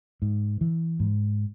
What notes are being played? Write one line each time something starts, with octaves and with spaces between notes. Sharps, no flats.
G#2
E3
G#2